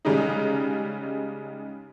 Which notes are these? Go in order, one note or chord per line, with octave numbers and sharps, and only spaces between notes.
C#3 G3 G#3 D#4